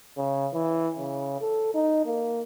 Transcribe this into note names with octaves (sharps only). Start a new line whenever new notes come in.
C#3
E3
C#3
A4
D#4
A#3